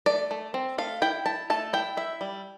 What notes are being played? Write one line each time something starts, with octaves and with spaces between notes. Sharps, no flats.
A3 D5
A3
C4
A3 F5
E4 G5
E4 A5
A3 A5
E4 G5
E4 E5
G3